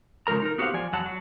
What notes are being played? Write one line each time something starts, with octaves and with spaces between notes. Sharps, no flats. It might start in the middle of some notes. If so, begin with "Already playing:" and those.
C#3 F3 G#3 A#4 A#5
D#4 A#4
B3 F#4 G4 C5 F5 F#5
F3 D5 G#5
E2 F#3 F#5 A5
F#3